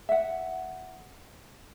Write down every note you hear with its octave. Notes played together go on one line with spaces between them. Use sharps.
E5 F#5